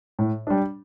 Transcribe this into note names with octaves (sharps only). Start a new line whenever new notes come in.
A2
G3 D4